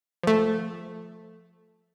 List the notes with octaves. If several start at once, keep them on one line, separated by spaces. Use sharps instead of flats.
F3 A3